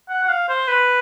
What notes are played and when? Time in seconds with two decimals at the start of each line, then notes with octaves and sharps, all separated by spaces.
0.09 F#5
0.23 F#5
0.29 F5
0.48 C5
0.68 B4